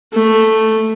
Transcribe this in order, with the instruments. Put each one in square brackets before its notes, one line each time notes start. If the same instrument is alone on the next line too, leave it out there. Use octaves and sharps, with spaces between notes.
[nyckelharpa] A3